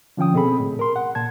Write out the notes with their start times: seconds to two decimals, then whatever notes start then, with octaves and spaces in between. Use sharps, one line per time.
0.17 D3 F3 C#4 G5 D#6
0.34 B2 C4 G#4 A4 B5
0.60 A2
0.79 A#4 C6
0.96 F#5
1.15 A#2 A5 G#6